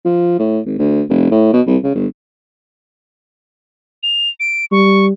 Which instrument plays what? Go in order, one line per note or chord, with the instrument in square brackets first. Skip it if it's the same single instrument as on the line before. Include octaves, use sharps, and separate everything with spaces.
[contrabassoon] F3
A2
G#1
D2
F1
A2
B2
C2
C#3
G1
[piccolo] F7
D7
[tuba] G3 [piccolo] C#6